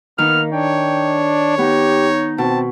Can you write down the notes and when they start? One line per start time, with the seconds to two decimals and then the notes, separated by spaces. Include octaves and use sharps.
0.18 D#3 A#3 B3 D#4 F6
0.53 D4 C#5 G5
1.58 B3 D#4 G4
2.38 B2 C4 A5